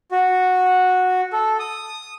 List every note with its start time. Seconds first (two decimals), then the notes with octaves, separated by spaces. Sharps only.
0.11 F#4
1.33 A4
1.59 D#6